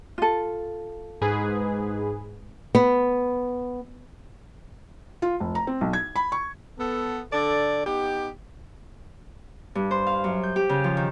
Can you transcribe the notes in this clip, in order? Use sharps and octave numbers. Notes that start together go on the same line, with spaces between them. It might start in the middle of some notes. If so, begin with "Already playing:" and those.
F4 A4
G#2 G#4 B4
B3
F4
F1
A#5
C4
B1
G#6
B5
C#6
B3 A4
D3 A4 D5
B3 D#4 G4
G2
C5
F5
F#2
G6
G4
C#3
F3
D#3